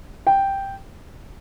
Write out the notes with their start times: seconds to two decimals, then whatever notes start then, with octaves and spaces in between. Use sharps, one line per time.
0.27 G5